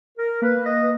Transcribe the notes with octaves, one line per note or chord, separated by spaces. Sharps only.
A#4
A#3 B4
D#5
B4